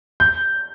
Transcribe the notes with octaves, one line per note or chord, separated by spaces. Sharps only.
G6